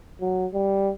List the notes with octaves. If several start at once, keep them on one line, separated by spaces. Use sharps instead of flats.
F#3
G3